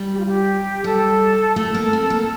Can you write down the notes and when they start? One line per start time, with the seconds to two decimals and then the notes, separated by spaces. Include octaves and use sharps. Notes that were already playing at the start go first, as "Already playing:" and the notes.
Already playing: G3
0.13 G4
0.20 F4
0.27 G4
0.84 G3 A4
1.56 A3 A4
1.75 A#3
1.93 C4
2.10 A#3